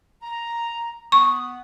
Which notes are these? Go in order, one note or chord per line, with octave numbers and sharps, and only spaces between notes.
A#5
B3 F#5 C#6 D#6